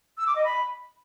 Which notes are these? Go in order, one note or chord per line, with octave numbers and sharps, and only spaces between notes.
E6
D6
D#5
B5